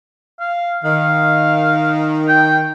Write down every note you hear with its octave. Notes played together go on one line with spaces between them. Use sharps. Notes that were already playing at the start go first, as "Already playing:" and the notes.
F5
D#3 F5
G5